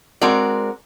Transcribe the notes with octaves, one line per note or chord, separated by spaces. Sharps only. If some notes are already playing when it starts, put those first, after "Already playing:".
G#3 C4 F#4 A#4 D5